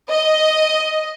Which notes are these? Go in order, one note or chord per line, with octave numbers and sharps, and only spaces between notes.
D#5